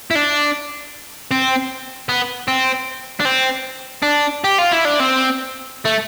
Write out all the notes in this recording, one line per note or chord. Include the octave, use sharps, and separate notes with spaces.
E4
D4
C4
B3
C4
D4
C4
D4
G4
F4
E4
D4
C4
A3